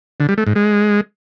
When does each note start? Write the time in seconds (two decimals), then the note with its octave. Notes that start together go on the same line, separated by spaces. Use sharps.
0.20 D3
0.29 G3
0.38 A3
0.47 G#2
0.55 G#3